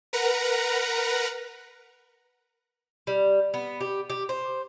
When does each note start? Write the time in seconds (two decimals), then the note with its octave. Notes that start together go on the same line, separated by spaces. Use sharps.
0.13 A#4 B4 F#5 A#5
3.07 G3
3.54 B3
3.81 G4
4.10 G4
4.29 C5